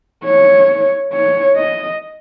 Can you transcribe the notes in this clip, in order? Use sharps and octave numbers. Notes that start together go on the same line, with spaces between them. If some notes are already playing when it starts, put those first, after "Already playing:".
C#5
C#5
D#5